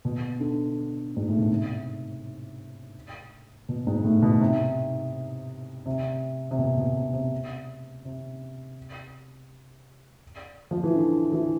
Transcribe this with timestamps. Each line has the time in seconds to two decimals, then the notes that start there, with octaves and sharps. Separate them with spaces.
0.05 B2
0.40 D3
1.16 G#2
1.28 A2
1.38 B2
1.50 C3
3.69 B2
3.87 G#2
4.04 A2
4.22 B2
4.41 C3
5.86 C3
6.51 C3
6.59 B2
6.77 B2
6.96 C3
7.14 C3
8.05 C3
10.71 F3
10.84 E3
10.95 D3
11.32 E3